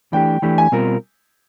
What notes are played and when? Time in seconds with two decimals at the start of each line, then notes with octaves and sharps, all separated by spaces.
0.13 E3 A3 D4 G4 G5
0.42 E3 A3 D4 G4 G5
0.58 G#5
0.72 B2 G3 C4 F4 A#4